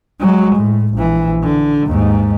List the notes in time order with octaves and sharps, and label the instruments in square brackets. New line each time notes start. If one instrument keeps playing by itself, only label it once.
[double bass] F#3 G#3
A2
A#1 E3
D3
D#2 G#2